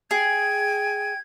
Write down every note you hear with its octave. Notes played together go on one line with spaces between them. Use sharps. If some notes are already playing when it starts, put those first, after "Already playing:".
G#4 G5 G#5 G#6